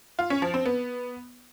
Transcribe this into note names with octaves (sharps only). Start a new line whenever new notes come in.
F4
C#4
F3
C4
B3